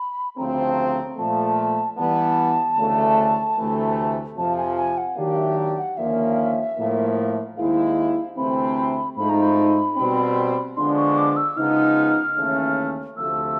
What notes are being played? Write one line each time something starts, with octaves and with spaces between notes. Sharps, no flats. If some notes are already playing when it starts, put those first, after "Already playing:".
Already playing: B5
D2 C#3 F3 A3 C4 A#5
A#2 F3 A3 A5
E3 G3 B3 A5
D2 C#3 E3 A3 D4
D2 C3 E3 A3
F2 C3 F3 A5
G#5
G#5
F#5
D#3 F#3 A#3 D4 G4 F5
E5
F#5
D#2 D3 F3 A#3 C#4 E5
A2 F3 A#3
D#2 D#3 G#3 C4 E4 F5
D2 C3 E3 A3 C4 B5
G#2 F3 A3 C4 D#4 B5
A#5
B5
B2 G3 C4
D3 F3 G#3 B3 D4 C6
C#6
D6
E6
C#3 F3 G#3 B3 D#4 F6
D#2 C#3 E3 A3 C#4
D2 C3 F3 A3 E6